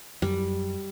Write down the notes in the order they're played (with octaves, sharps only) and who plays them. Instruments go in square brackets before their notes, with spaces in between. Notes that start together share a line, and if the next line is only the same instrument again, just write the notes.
[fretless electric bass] F#2 [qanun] G3